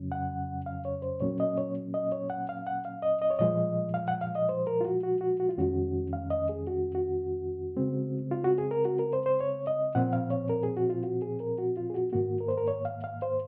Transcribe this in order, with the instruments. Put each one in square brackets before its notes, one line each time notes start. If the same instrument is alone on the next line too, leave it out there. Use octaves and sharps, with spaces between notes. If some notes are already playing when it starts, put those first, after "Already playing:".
Already playing: [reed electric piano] F2 C#3 F#3 C#4
F#5
F5
C#5
C5
A#2 F#3 A#3 C#4 C#5
D#5
C#5
D#5
C#5
F#5
F5
F#5
F5
D#5
D#5
C#5
A#2 F3 G#3 D#5
F5
F#5
F5
D#5
C5
A#4
F4
F#4
F#4
F#4
F#4
F4
F2 D#3 G#3 C#4 F#4
F5
D#5
G#4
F#4
F#4
C#3 G#3 C4
F4
F#4
G#4
A#4
F#4
A#4
C5
C5
C#5
D#5
A#2 F3 C4 F#5
F5
C#5
A#4
G#4
F#4
F4
F#4
G#4
A#4
F#4
F4
G#4
F#4
G#2 D#3 A#3 F#4
A#4
C5
A#4
C#5
F5
F5
C5